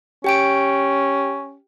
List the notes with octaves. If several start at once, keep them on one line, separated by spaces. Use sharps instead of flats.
C#4 G4 G5 D7